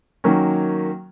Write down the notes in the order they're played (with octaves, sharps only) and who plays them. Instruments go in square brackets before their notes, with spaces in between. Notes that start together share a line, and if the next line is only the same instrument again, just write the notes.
[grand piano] D#3 F#3 A#3 C#4